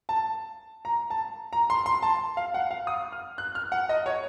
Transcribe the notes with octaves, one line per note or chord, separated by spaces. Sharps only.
A5
A#5
A5
A#5
C6
C6
A5
F5
F#5
F5
D#6
F6
F#6
F6
F#5
D#5
C#5